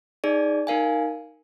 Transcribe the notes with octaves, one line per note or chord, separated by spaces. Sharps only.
D#4 G#4 D5
D#4 A#4 F5 G#5